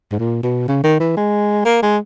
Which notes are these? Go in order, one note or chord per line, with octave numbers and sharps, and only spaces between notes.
G#2
A#2
B2
C#3
D#3
E3
G#3
A#3
G#3